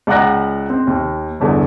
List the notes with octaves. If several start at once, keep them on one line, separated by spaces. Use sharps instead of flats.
C#2 D5 F#5 A#5 F#6 A#6
C4
D#2
G1 E2 D3